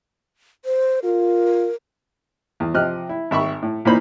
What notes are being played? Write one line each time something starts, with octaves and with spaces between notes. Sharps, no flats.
C5
F4 A#4
E2
C3 F3 D#5 F6 F#6
E4
G#1 E5 B5 C#6
A2
A#2 E3 A#3 D#4 C5 B5